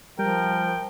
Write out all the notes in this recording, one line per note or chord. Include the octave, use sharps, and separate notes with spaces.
F3 G3 A#4 G5